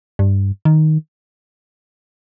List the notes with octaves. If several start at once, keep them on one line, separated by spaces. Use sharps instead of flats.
G2
D#3